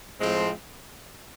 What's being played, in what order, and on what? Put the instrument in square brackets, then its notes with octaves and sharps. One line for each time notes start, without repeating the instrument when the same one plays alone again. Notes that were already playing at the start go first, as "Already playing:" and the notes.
[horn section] A2 F3 G#3 C4